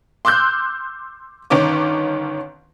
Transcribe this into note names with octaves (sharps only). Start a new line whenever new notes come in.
C6 D6 E6 F#6 G6
G1 D#3 C#4 D6